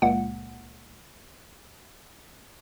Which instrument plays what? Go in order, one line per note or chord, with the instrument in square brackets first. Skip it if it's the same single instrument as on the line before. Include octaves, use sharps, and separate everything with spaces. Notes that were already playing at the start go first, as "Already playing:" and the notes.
[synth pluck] C#2 A#2 A#3 F#5